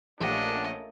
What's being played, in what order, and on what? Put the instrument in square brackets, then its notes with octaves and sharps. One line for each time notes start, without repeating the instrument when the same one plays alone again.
[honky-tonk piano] A#1 G4 F#5 [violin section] A3 A#3 C#4 [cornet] D4 [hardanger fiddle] D#5